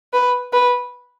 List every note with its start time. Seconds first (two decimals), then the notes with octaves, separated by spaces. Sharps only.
0.13 B4
0.53 B4